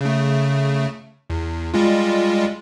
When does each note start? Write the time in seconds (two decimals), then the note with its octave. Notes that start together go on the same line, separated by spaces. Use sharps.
0.01 C#3 A3
1.30 E2
1.74 G3 G#3 F4